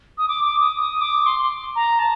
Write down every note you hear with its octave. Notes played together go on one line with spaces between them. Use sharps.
D#6
D6
D6
D#6
D#6
D6
C6
A#5
A5